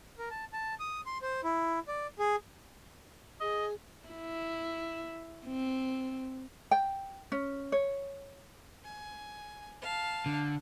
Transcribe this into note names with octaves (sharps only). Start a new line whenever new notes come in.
A#4
A5
A5
D#6
C6
C5
E4
D5
G#4
G#4 D#5
E4
C4
G5
C#4
C#5
G#5
F5 A5
D3